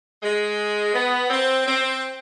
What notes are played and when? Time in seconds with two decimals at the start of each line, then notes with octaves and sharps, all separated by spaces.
0.22 G#3
0.94 B3
1.30 C4
1.66 C4